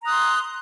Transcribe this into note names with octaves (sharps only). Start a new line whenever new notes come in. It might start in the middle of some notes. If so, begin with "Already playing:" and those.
A#5 C6 D#6 F#6